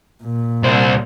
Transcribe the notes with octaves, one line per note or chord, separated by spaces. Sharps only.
A#2
C2 C5